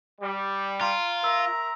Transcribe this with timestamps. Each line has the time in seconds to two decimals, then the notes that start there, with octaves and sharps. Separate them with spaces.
0.21 G3
0.81 F4 A#5 C6 D7
1.24 A#4 E5 A#5 E6